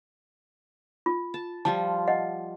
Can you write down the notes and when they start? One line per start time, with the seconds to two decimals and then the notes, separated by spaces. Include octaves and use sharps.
1.06 F4
1.34 A5
1.65 F3 G3 F4 A5
2.08 D#5 F#5